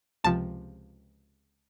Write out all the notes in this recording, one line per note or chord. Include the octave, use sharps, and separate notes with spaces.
C#2 C3 F3 A5